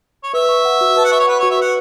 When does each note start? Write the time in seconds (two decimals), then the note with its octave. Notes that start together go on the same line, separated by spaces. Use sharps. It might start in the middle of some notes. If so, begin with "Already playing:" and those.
0.23 C#5
0.34 B4 E5
0.49 C#6
0.65 F#5
0.81 F#4
0.97 B4 A5
1.05 F#5
1.12 E5 C#6
1.19 C#5
1.27 B4 F#5
1.39 F#4 C#5
1.50 E5
1.57 B4 F#5